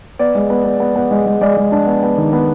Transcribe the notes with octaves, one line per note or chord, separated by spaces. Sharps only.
B3 D5
G#3
B3
B3
B3
B3
G#3
G#3
G#3 D5
G#3
D4
B3
B3
D#3
B3